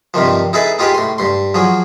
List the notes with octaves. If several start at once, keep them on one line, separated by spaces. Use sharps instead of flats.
G2 C3 D#3 F3
D#4 E4 G#4 A4 B4
D#4 F4 G4 G#4 B4
A2 C6
G2 C6
F3 F#3 G#4